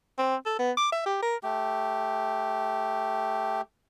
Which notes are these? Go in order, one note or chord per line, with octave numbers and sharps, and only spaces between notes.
C4
A4
B3
D6
E5
G4
A#4
A3 G4